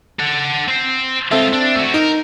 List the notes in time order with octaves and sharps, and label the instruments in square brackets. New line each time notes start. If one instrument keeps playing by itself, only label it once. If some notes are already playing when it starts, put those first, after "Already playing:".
[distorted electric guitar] A4 F#5
C4 C5
[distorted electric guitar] G#3 F4 [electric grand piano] C4 A4 E5
[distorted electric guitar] D4
A3 F#4
[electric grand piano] D#4 [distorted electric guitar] A#4